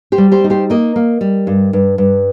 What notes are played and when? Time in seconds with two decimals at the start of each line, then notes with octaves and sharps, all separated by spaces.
0.12 G4 C5
0.18 G3
0.32 G4 C5
0.44 D#4
0.50 G4 C5
0.70 A#3 A#4 D#5
0.96 A#3
1.21 G3
1.47 G2
1.73 G2
1.98 G2